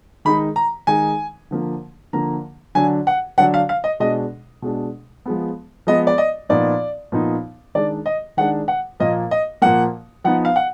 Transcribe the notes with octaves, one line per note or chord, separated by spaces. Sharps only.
D#3 G#3 D#4 B5
A#5
D#3 G#3 D#4 G#5
D3 F3 A#3
D3 F3 A#3 A#5
D3 F#3 D4 G#5
F#5
D3 F#3 D4 F#5
F5
F5
D#5
B2 G#3 D4 D#5
B2 G#3 D4
F3 G#3 B3
F3 G#3 B3 D#5
D5
D#5
A#2 F3 B3 D#4 D5
A#2 F3 B3 D#4
D#3 G#3 D4 D5
D#5
D#3 G#3 D4 F#5
F#5
A#2 F3 A#3 D#5
D#5
A#2 F3 A#3 F#5
F3 B3 D#4 F#5
F5
F#5